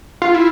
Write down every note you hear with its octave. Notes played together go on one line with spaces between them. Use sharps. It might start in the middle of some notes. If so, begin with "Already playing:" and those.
F4
E4